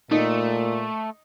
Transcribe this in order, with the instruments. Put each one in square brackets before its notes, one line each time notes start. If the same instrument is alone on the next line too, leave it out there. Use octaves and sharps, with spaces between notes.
[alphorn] A#2 [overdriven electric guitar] A3 [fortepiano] D#4